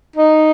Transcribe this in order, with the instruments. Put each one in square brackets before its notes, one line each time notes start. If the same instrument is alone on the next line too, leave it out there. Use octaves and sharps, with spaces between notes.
[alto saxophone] D#4